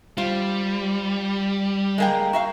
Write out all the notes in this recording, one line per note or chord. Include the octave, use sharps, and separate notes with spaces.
G3 F4 C5
G#3 A#3 G5
F#4 E5 F5